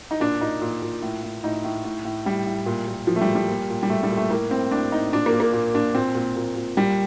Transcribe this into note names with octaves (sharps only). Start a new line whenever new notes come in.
D#4
A#2 D4
A#2 D#4
A#2
A#2
A2
A2
A2 D#4
A2
A2
A2
A2 G3
A2
A#2
A#2
A#2 F3
A3
G3
A#2
G3
A#2
A#2
G3
A#2 A3
G3
A#2
A3
A2 A#3
A2 C4
A2 D4
A2 D#4
A#2 D4
A#3
A#2
A#3
A#2
A#2 D4
A#2 C4
A#2
A#2
A#2
A#2 G3